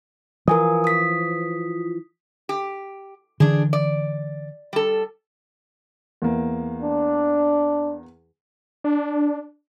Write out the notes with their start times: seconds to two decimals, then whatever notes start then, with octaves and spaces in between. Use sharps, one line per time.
0.48 E3 F3 A#4 G#5 D#6
0.84 D#6 B6
2.49 G4
3.40 D3 E3 D4 G#4
3.73 D5
4.73 G3 A4
6.22 E2 A#3
6.83 D4
8.84 D4